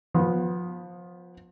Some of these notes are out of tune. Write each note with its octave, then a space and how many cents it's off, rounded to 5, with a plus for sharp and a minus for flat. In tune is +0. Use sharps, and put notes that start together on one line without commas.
F3 +25 B3 +0